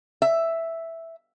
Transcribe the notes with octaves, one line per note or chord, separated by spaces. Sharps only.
E5